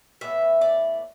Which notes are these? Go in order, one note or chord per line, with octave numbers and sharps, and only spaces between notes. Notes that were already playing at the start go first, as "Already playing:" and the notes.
A2 E3 B3 E5
D5